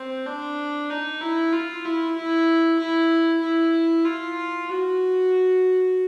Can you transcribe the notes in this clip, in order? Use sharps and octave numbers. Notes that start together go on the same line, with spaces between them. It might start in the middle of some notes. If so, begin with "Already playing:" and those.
Already playing: C4
D4
D#4
E4
F4
E4
E4
E4
E4
F4
F#4